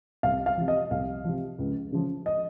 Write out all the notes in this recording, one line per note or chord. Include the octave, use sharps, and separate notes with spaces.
C2 F5
F5
C3 F3
D#5
C2 F5
C3 F3
C#2
C#3 F3
D#5